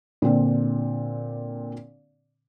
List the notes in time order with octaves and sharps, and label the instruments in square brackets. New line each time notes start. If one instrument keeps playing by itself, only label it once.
[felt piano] A#2 D3 C4 D4